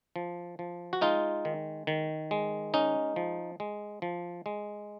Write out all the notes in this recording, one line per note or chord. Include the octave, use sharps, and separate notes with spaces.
F3
F3
F#4
G#3 D#4 F4
D#3
D#3
G#3
C#4 D#4
F3
G#3
F3
G#3